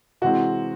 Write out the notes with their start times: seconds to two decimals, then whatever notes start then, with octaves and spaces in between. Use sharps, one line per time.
0.22 C3 E3 G#3 C4 F#4